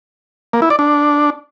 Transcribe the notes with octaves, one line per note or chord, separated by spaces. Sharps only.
A#3
E4
D5
D4